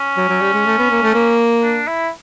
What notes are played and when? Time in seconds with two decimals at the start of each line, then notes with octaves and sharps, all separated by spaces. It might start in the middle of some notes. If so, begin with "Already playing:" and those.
Already playing: C#4
0.17 F#3
0.30 F#3
0.41 G3
0.54 G#3
0.66 A3
0.79 B3
0.91 A#3
1.03 A3
1.15 A#3
1.63 D4
1.87 E4